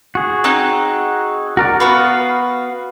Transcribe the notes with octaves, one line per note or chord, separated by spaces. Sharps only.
F#4 G#4
C4 D#4 F#6
F#4 A#4 D5
B3 F#4 B4 F5